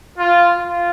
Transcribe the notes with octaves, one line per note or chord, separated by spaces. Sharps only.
F4
F4